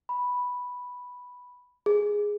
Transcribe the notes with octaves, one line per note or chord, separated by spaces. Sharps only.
B5
G#4